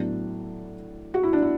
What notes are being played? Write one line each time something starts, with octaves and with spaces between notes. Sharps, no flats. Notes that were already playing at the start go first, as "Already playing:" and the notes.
Already playing: A2 F#3 B3 D4
F#4
E4
D4
E4